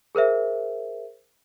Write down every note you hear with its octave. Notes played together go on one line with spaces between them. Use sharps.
G#4 A#4 C5 E5